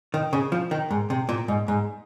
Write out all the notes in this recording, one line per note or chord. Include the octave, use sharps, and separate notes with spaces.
D#3
C#3
F3
D#3
G#2
C3
A#2
G#2
G#2